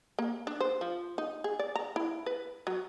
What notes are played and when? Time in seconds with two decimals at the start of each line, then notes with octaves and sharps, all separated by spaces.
0.19 A#3
0.47 D4
0.60 C5
0.81 F3
1.18 D#4
1.44 G#4
1.59 D5
1.75 A#5
1.96 E4
2.26 B4
2.67 F#3